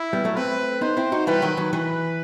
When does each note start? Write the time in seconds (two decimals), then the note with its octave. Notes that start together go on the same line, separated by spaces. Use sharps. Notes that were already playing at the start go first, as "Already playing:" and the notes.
Already playing: E4
0.13 G3 B3
0.25 F#3 A3
0.36 A3 C4 B4
0.81 B3 D#4 C5
0.97 C4 E4
1.12 D#4 F#4
1.27 E3 G3 B4
1.42 D#3 F#3
1.57 D#3 F#3
1.73 E3 B4